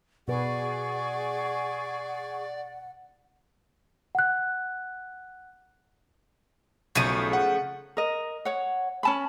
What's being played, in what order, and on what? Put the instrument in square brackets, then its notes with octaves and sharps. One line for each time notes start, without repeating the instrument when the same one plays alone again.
[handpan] B2 B4 [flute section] G#4 C#6 [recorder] D5 [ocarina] F#5
[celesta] F#5 F#6
[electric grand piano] B1 D#7 [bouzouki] C#3 F3 A3
[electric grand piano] F#5
[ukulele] A#4 D#5
C#5 F#5
C#4 A5 B5